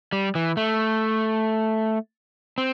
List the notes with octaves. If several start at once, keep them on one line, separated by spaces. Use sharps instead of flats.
G3
E3
A3
C4